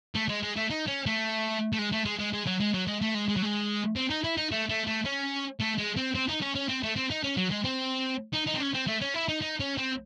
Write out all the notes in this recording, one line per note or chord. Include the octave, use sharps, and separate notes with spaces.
A3
G#3
G#3
A3
D#4
C#4
A3
A3
G#3
A3
G#3
G#3
G#3
F#3
G#3
F#3
G#3
A3
G#3
G#3
F#3
G#3
C4
D#4
E4
D#4
A3
A3
A3
C#4
A3
G#3
C4
C4
D#4
C#4
C#4
C4
A3
C4
D#4
C#4
F#3
G#3
C4
D#4
D#4
C4
C#4
C4
A3
C#4
E4
D#4
D#4
C#4
C4